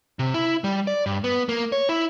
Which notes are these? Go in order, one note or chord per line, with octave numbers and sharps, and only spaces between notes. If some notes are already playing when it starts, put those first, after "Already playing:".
C3
E4
G3
D5
G2
B3
A#3
C#5
E4